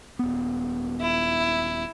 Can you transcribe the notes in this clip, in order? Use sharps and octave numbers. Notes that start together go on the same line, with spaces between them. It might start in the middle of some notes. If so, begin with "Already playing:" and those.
D#1 B3
E4